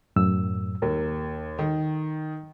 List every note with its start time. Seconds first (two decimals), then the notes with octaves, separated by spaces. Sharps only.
0.16 F#2 A2 E6
0.82 D#2 A#4
1.59 D#3